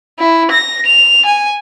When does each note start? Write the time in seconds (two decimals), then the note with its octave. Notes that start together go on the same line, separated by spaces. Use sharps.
0.19 E4
0.51 A#6
0.86 F7
1.26 G#5